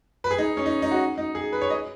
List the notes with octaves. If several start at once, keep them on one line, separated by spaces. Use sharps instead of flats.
B4
G#4
D#4
C#4
D#4
D#4
F#4
D#4
G#4
B4
C#5
D#5